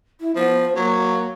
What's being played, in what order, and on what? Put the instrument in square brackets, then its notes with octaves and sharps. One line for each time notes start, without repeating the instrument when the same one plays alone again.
[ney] E4
[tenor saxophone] F3 [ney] B3
[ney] C5
[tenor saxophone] F#3 [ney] A#3